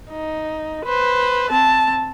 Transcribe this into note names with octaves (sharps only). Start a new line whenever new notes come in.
D#4
B4 C5
C4 A5